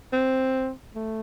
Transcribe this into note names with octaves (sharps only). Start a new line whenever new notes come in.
C4
A3